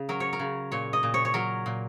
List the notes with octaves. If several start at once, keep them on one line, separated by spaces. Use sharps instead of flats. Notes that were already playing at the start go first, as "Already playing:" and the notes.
Already playing: C#3
F#3 A#4
C#5
A#4
C#3
A#2 C#5
D#5
A#2
C#5
C#5
F#3 A#4
A#2